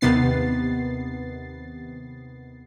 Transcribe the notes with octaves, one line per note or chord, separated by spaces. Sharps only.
D#2 C3 D#3 B3 A6 C7